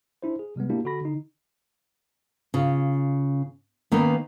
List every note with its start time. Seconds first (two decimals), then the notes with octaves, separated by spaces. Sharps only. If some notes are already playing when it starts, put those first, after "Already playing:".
0.23 D4 E4 C5
0.39 G#4
0.56 C3 G3 G#3 B3
0.70 A#3 D4 E4 F#4 G4
0.85 D3 F#4 A4 B5 A#6
1.01 D3 D#4
2.54 C#3 F4
3.92 D#3 A#3 B3 C#4 D#4 B4